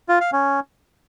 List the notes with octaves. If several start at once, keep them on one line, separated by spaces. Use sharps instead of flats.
F4
F5
C#4